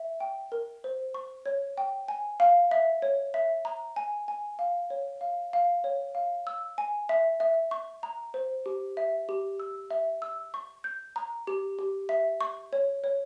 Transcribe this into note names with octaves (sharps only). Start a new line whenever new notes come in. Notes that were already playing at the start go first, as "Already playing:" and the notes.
Already playing: E5
G5
A#4
C5
C#6
C#5
G5
G#5
F5
E5
C#5
E5
A#5
G#5
G#5
F5
C#5
F5
F5
C#5
F5
E6
G#5
E5
E5
C#6
A#5
C5
G4
E5
G4
E6
E5
E6
C#6
G6
A#5
G4
G4
E5
C#6
C#5
C#5